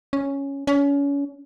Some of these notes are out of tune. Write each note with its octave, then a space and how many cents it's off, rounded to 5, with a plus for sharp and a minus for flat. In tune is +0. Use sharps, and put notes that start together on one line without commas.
C#4 +0
C#4 +30